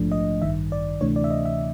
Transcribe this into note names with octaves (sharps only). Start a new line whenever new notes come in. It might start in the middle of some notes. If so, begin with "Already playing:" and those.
Already playing: A#1 G#2 F3 A3 D4
D#5
A1 G2 D#3 E5
D5
D2 C3 E3 A3 D4 C#5
D5
E5
D#5
E5